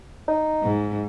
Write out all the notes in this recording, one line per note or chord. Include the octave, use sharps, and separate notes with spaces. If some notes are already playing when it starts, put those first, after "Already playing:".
D#4
G#2